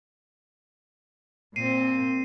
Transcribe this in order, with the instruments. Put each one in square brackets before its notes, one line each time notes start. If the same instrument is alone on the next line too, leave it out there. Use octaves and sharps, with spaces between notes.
[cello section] A#2 C4 [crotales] C7 D#7